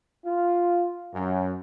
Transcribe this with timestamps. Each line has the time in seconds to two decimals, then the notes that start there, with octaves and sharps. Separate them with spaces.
0.25 F4
1.14 F#2